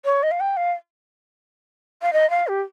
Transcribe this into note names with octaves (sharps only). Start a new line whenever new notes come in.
C#5
D#5
F5
G5
F5
F5
D#5
F5
G4